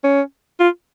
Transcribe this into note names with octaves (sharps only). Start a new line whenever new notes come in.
C#4
F4